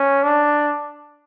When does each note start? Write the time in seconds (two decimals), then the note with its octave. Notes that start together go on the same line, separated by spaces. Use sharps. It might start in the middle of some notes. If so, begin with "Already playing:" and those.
Already playing: C#4
0.23 D4